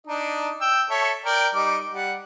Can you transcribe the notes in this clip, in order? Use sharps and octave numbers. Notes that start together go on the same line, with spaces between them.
D4 D#4 D#5
G5 E6
A4 C#5 E5
A#4 D5 G5
G3 D#4 D6
G3 F#5